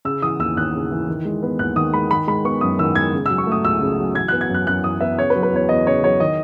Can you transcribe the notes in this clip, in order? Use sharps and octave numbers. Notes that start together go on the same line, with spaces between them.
C#3 E6
E3 D#6
D#2 E6
D#2 F#6
C#3
E3
D#3
G#3
B3
D#2 F#6
D#3 D#6
G#3 B5
D#3 B5
G#3 B5
B3 C#6
F#2 D#6
D#3 E6
G#3 G#6
C#3
F#3 E6
C#6
A3 D#6
C#2 E6
C#3
F#3
E3 G#6
B3 F#6
G#6
F#2 F#6
F#2 F#6
E3 D#6
B3 E5
C#3 C#5
B4
F#3
B4
E2 C#5
E2 D#5
C#3 C#5
F#3 C#5
D#3 D#5